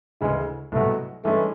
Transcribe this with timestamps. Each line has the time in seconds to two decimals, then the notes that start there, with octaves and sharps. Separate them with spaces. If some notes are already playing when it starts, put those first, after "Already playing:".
0.21 D2 C#3 E3 G#3
0.72 C2 B2 F#3 A3
1.24 G2 E3 G#3 A3 C#4